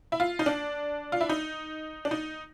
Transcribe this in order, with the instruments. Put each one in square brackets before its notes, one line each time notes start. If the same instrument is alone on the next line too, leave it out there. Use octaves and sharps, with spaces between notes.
[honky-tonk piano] E4
F4
D#4
D4
F4
E4
D#4
D4
D#4